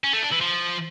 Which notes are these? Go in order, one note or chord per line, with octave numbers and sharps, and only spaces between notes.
C#4
A3
D4
E3
F3